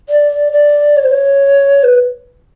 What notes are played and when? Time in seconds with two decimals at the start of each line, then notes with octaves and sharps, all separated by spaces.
0.09 D5
0.53 D5
0.97 C#5
1.04 C5
1.12 C#5
1.84 B4